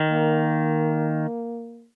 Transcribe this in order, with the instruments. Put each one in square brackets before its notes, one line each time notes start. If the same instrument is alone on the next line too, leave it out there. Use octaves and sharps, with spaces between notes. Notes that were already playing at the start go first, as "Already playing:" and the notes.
Already playing: [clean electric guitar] D#3
[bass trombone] A#3